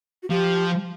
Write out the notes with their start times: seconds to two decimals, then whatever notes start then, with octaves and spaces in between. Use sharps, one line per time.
0.23 F#4
0.29 F3 G4